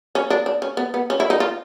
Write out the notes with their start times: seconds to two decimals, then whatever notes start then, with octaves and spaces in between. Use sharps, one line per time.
0.15 C#4
0.30 D4
0.46 D4
0.62 C#4
0.77 B3
0.94 B3
1.10 C#4
1.20 E4
1.30 D#4
1.40 F4